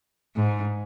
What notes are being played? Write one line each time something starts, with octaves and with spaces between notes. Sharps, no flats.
G#2